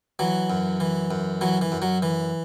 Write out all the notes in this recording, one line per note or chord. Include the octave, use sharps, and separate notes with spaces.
E3 F#3
F#2
E3
F#2
E3 F#3
E3
F#2
F#3
E3